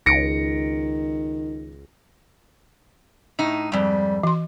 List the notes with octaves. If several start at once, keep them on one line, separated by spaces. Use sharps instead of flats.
C#2 D#3 A#6 C#7 D7
A2 D#4
F2 G#2 G3
E3 C6